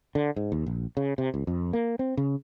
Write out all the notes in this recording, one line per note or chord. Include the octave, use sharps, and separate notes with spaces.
D3
G#2
D#2
A#1
C#3
C3
C#2
F2
A#3
C4
C#3